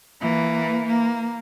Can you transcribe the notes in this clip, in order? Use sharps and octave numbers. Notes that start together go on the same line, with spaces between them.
E3 A#3
A#3